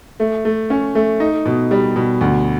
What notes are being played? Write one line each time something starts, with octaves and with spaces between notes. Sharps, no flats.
A3
A3
C#4
A3
D#4
B2
G3
B2
D2